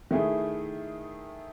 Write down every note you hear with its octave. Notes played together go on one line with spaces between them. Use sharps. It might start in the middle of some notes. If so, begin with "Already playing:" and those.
D#3 A3 E4 G#4